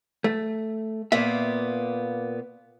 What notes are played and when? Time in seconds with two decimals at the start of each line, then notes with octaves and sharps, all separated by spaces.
0.24 A3
1.12 A#2 A#3 B3 E5